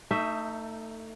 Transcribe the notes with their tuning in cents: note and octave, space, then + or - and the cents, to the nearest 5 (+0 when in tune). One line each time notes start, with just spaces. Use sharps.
A3 +25 D#4 +0 E5 +0